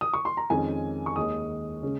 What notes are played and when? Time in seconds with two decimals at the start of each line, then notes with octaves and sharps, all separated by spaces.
0.01 D#6
0.14 C#6
0.25 C6
0.37 A#5
0.50 F2 D#3 G#3 C#4 G#5
1.06 C#6
1.16 D#2 D#3 G#3 D#6
1.83 C#3 G#3 C#4